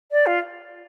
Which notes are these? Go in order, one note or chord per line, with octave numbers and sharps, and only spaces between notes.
D5
F4